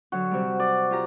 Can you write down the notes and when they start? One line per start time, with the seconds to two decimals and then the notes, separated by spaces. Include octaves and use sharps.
0.12 D3 F#3 F#4
0.31 C3 G3
0.60 D5
0.90 F4 G4 A#5